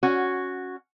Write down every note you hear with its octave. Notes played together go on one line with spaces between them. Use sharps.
C#4 F#4